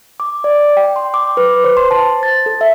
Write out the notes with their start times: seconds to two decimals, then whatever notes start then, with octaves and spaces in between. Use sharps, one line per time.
0.20 D6
0.44 D5
0.77 G5
0.96 C6
1.14 D6
1.37 B4
1.64 C5
1.77 C6
1.91 A5
2.23 A6
2.46 A4
2.61 E5